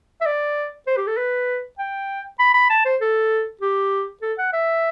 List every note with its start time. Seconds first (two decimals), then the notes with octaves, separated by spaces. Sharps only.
0.21 E5
0.26 D5
0.87 C5
0.97 G4
1.07 A4
1.17 B4
1.79 G5
2.39 B5
2.54 B5
2.70 A5
2.85 C5
3.01 A4
3.61 G4
4.22 A4
4.38 F#5
4.53 E5